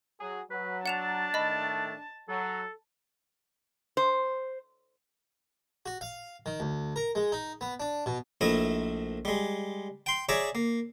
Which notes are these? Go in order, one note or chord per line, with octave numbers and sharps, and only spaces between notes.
F#3 G#4
F#3 B4
D4 F#5 A5 E7 F7
A2 D#3 A3 D#5 B5
F#3 A4
C5
F#4
F5
D#3
D2
A#4
G#3
D#4
B3
D4
B2
A#1 A3 E4 D#5
G3 G#3
G5 C6
G#4 C#5 D5 E5 A#5
A#3